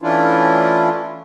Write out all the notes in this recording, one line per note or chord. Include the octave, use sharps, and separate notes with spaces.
E3 A3 C#4 D4 E4 F4